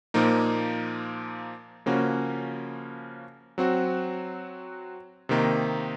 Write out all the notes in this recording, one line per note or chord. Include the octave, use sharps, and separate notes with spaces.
A#2 F3 A#3 D#4
C#3 F3 A#3 C#4 F#4
F#3 C4 F#4
C3 D#3 A#3 D#4